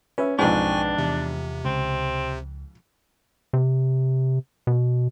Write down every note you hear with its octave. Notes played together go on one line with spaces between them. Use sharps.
C#4 B4 E5
B1 F2 G#2 D4 B4 G5 G#5 C#6
E2 C3
C#2 C4
C3
B2